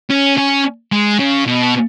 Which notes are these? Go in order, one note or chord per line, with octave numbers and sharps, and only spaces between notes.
C#4
C#4
G#3
C#3
B2